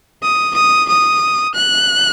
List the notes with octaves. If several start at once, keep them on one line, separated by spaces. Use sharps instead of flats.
D#6
D#6
D#6
F#6